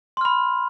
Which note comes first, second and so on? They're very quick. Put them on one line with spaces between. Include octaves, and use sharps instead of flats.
C6 F6 B5